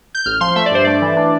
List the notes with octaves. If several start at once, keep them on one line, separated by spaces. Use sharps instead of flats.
G6
A1 F6
F3 C6
A3 E5
D5
G2 C5
A3 D5
E3
D4